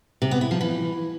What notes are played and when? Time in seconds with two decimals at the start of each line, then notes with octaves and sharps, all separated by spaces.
0.22 C3
0.31 B3
0.41 E4
0.51 F3
0.61 E3